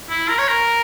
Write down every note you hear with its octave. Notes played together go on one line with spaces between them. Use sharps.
E4
A#4
C#5
A#4